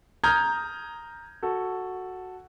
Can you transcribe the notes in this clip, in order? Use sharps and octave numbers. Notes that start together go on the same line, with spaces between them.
A#5 D#6 F6 G6 G#6
F#4 A4